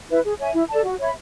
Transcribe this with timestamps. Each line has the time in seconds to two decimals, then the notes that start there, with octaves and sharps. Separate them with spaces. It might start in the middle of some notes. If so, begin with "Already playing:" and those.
0.09 E4 B4
0.24 G#4
0.39 C#5 E5 G#5
0.54 E4
0.69 A4 D5 A5
0.84 F#4
0.99 C#5 E5 B5